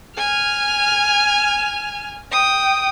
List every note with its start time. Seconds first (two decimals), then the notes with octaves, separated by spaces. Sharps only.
0.18 G#5 F6
2.32 G5 D#6